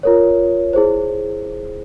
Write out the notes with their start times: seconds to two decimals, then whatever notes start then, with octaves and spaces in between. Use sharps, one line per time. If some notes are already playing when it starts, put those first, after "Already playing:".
0.03 F4 A#4 C#5
0.73 E4 G#4 C5